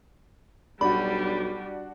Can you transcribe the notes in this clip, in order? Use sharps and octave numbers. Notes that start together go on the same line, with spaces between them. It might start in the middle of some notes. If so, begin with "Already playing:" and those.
B1 G3 D4 F#4 B5